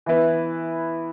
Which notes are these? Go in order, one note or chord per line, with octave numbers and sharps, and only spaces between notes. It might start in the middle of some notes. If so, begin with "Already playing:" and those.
E3 B3 E4 B4